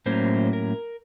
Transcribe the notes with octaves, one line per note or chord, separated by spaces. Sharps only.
A2 F#3 A#3 C#4 C5
A#4